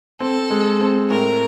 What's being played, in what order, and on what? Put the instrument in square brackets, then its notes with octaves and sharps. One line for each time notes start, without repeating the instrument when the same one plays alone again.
[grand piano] C4 [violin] A4
[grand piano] G#3
C4
[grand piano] A2 [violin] A#4